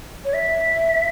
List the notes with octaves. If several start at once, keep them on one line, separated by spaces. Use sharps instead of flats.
C#5
E5